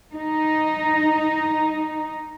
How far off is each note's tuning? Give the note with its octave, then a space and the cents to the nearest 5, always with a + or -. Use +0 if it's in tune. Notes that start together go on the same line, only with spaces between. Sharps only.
D#4 +0